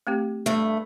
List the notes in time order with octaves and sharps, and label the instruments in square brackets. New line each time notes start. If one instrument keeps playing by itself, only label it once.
[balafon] A3 C4 G4
[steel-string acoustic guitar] G2 A3 [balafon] E5